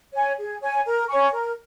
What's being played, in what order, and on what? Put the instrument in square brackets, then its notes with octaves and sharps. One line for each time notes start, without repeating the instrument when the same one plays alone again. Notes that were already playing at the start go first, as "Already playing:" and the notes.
[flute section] C#5 G#5
G#4
C#5 G#5
A#4
C#5 G#5 C#6
A#4